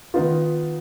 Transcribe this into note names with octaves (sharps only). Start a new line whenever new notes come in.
D#3 B3 D#4 F4